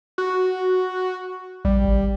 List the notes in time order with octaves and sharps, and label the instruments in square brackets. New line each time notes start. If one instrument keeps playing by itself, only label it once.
[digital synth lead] F#4
[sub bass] A#1 [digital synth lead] G3
[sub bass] G#1